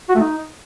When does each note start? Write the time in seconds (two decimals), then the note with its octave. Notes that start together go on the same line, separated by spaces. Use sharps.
0.09 F#4
0.15 A3
0.20 D#4